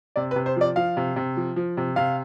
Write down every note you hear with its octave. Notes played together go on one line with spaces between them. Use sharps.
C3 D5
B4
C3
C5
F3 D5
F3 F5
C3
C3
F3
F3
C3
C3 F5